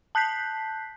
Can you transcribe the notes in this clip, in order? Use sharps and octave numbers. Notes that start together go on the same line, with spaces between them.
A5 F#6 G6 B6 C7